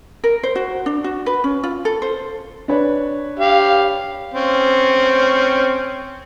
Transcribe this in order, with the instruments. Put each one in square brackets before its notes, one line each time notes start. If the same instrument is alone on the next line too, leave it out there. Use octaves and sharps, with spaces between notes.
[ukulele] A#4
C5
F#4
D4
F#4
B4
C#4
F4
A4
C5
[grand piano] D4 B4 C#5
[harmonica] G4 F5
C4 C#4